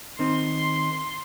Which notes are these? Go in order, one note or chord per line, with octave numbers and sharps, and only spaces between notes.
D#3 C4 D#4 C6